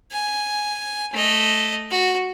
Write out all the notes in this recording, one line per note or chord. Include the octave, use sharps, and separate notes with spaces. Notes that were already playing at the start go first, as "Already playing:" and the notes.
G#5
A3 D#5
F#4